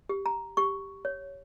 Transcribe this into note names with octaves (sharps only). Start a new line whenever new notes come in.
G4
A#5
G4 C#6
C#5